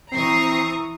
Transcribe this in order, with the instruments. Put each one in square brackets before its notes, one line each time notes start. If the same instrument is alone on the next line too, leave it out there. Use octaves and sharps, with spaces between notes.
[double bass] E3 [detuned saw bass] C4 [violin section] A#5 C#6 D#6 [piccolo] C7